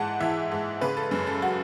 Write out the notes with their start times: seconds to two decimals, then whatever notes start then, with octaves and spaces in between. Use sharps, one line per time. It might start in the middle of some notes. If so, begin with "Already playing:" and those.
Already playing: G#2 E3 F#5 A5
0.20 E3 E5
0.52 G#2
0.81 C#3 B4
0.97 A4
1.11 F#2
1.27 A4
1.42 F#4